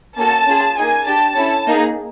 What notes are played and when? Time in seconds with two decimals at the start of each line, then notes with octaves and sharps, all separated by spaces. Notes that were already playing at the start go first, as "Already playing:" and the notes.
0.17 A#3 C#4 F#4 A4 A5
0.46 C#4 F4 G#4
0.76 A#3 D#4 G#4 G#5
1.07 D4 G4 A5
1.36 C#4 E4 A4
1.66 A#3 D#4 G#4